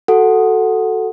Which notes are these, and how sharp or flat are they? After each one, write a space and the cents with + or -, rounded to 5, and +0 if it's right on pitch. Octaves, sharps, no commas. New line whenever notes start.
F#4 +5 A4 +0 F#5 -5